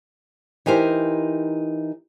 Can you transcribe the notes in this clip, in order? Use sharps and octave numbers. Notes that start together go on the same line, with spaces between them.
E3 D#4 G4 A#4 C5